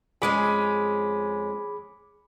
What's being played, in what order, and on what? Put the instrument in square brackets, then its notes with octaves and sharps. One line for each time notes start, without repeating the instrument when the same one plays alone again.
[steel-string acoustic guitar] F2 G#3 C#4 [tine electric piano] G#4 B5 D6